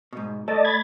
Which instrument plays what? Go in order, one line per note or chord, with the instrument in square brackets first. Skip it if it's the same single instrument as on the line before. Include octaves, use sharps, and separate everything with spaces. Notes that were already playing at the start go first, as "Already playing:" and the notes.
[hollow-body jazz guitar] G#2 B2
[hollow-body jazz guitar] A3 [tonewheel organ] D5 D#5 A5
[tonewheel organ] B5 G#6 A6